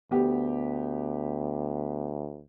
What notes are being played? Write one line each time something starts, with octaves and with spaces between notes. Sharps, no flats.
D2 B3 G4